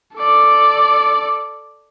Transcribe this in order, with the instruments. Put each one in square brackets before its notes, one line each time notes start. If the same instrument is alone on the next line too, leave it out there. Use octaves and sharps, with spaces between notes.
[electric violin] A4 D5